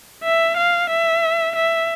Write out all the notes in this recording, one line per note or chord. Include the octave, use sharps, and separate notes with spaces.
E5
F5
E5
E5